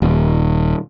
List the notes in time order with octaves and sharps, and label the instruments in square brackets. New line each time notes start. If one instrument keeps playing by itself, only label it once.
[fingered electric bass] D#1